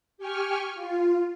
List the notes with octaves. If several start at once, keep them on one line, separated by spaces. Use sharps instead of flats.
G4 G5 G#5 C#6 F6
F4